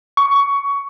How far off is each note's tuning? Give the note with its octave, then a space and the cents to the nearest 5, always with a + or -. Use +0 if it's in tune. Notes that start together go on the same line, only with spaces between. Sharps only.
C#6 +15